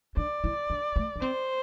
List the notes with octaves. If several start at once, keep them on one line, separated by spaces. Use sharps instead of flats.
D4 D5
E4
D4
A3
D4
C4 C5